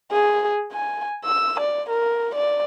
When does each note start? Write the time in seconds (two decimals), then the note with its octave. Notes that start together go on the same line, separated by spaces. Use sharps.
0.11 G#4
0.72 G#5
1.25 E6
1.60 D5
1.90 A#4
2.35 D5